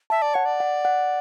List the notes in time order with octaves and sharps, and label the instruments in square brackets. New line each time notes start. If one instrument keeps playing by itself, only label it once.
[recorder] E5 [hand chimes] A5
[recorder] D5
[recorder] C#5 [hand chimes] F#5
[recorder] D5
[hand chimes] F#5
F#5